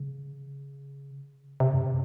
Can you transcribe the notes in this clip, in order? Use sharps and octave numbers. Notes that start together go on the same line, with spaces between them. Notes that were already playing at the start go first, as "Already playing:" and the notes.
Already playing: C#3
C3
F#2